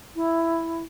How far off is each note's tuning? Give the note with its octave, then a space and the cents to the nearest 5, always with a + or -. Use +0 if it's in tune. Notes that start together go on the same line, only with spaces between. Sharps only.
E4 +5